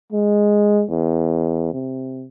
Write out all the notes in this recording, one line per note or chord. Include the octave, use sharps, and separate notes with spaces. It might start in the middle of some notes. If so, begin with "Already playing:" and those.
G#3
E2
C3